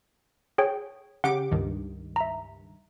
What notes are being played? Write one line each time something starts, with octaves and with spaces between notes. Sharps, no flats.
G#4 C#5 G5
C#3 G4 F#5 D6
C#2 G2 D#3
E5 A#5